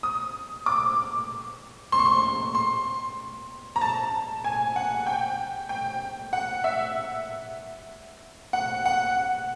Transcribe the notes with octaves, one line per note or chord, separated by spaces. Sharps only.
D#6
D6
C6
C#6
C6
C6
A#5
A5
G#5
F#5
G5
G5
F#5
E5
F#5
F#5